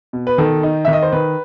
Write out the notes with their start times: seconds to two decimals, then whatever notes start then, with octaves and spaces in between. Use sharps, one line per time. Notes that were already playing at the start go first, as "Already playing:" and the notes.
0.13 B2
0.27 B4
0.38 D#3 A4
0.63 D#4
0.85 D#3 E5
0.93 D#5
1.03 C5
1.12 D#3 B4